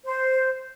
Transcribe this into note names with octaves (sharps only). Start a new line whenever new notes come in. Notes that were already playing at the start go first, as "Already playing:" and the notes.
C5